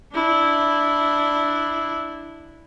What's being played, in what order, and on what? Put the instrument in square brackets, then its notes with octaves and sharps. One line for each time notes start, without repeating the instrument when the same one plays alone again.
[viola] D4 E4